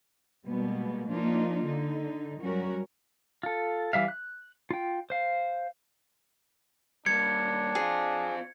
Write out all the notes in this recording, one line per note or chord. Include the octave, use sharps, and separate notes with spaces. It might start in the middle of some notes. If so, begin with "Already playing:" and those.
B2 G3 G#3 A#3 B3
F3 A#3 D4 D#4 F4
D3 D#4
F#2 F#3 G3 C#4 F#4 A#4
F4 A4
E3 G3 E5 F5
F#6
F4 G5
C5 F5
G3 A#3 D4 G#6 C#7
C4 F4 G#4